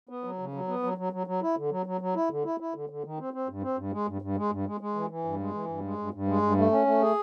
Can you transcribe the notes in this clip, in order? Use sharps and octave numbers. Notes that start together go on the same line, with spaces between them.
B3
F#3
C#3
F#3
B3
F#3
F#3
F#3
F#3
E4
D3
F#3
F#3
F#3
E4
D3
E4
E4
D3
D3
D#3
C4
C4
G2
C4
G2
G#3
G2
G2
G#3
G2
G#3
G#3
E3
E3
G2
G#3
E3
G2
G#3
G2
G2
G#3
G2
A3
C#4
A3
G#4